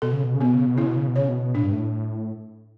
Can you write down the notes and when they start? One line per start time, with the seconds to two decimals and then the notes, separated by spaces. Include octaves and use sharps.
0.02 B2 A4
0.13 C#3
0.24 B2
0.34 C#3
0.41 B2 B3
0.55 C#3
0.66 B2
0.76 C#3 E4
0.86 B2
0.96 C#3
1.07 B2
1.16 C#3 C#5
1.29 B2
1.55 A2 D4
1.63 G2
1.72 A2